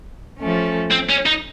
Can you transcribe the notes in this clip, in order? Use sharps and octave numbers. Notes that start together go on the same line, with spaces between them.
F3 A3 C#4
C4
C#4
D#4